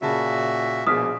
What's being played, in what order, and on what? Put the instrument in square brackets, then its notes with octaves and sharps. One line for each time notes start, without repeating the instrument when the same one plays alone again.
[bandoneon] A#2 F#4 E5 [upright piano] C#3 A5
[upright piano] A#1 B2 G#4 [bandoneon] A#3 [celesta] D#6 F6 B6